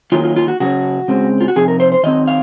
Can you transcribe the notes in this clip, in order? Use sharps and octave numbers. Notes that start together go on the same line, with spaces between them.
D#3 F#3 A#3 D#4 F4
F4
F4
F#4
C#3 F#3 C#4 F#4
C#3 G#3 C4
F4
F#4
C3 F3 C4 D#4 G#4
A#4
C5
C5
D#3 F#3 C4 D#4 D#5
F5